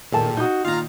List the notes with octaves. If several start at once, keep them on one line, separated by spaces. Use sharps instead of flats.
A#2 D#3 G#4 A4 G5 A5
D#4 F#4 D#6 G6
A#2 D#3 F4 F5 A#5